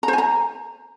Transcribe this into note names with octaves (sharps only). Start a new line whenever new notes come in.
A#5
C5
G#5
A#5